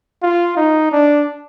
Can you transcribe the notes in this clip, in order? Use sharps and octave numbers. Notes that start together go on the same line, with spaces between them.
F4
D#4
D4